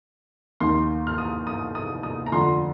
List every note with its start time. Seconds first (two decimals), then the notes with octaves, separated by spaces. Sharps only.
0.60 D#2 D#3 A#3 C6
1.07 F6
1.18 D#6
1.47 D#6
1.75 D#6
2.03 D#6
2.26 A#5
2.32 F2 D3 A3 C6